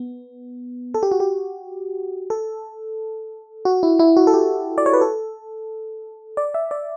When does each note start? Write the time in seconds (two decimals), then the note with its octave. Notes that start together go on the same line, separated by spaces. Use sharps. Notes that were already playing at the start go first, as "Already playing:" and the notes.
Already playing: B3
0.94 A4
1.03 G4
1.12 F#4
1.20 G4
2.30 A4
3.65 F#4
3.83 E4
3.99 E4
4.17 F#4
4.27 A4
4.34 G4
4.78 D5
4.86 C#5
4.93 B4
5.01 A4
6.37 D5
6.54 E5
6.71 D5